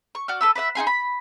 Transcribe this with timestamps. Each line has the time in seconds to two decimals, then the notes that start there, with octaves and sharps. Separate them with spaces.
0.15 C#6
0.28 F#4 D5 F6
0.41 A4 B4 E6
0.55 B4 D5 E5 F#5
0.75 D#4 F4 G#4 C6
0.87 B5